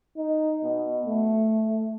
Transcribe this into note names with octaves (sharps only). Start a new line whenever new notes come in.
D#4
B2
A3